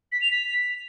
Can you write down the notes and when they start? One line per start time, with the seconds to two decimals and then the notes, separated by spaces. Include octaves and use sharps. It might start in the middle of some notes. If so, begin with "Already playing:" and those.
0.12 B6
0.22 F7
0.31 B6